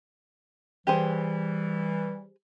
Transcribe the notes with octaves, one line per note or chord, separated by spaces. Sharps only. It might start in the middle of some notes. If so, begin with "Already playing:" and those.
E3 G3 G4 G#4 C5